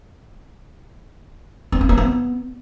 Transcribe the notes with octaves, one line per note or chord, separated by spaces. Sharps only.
B3
C4
A#3
B3